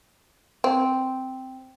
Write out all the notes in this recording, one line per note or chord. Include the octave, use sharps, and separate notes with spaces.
C4